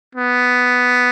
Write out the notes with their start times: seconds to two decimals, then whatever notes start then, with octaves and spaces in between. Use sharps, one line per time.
0.15 B3